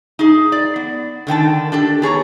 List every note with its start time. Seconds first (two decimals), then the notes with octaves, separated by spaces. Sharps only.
0.19 D#4 G#4
0.52 D5
0.76 B3
1.27 D3 D#3 G5 A5
1.72 D4 G4 A4
2.02 B3 G#4 C#5 A#5